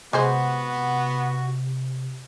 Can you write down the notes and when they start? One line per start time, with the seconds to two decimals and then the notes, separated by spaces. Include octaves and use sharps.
0.13 C3 G#3 B3 F#4 G#4 C5